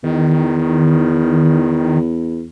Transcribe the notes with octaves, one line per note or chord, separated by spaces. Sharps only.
E2 D#3